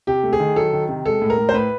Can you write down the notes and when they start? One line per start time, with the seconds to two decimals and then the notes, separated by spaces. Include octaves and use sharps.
0.07 C3 G4
0.23 A3
0.33 G#4
0.40 D#3
0.56 F#3 A4
0.73 D#3
0.89 C3
1.05 G#3 A4
1.22 A2
1.30 A#4
1.38 A2
1.49 C5
1.54 A2 B4